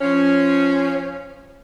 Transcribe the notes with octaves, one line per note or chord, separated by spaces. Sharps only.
F3 C#4